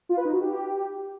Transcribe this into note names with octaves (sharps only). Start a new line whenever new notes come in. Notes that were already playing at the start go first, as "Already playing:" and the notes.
F4
B4
D#4
F#4
G4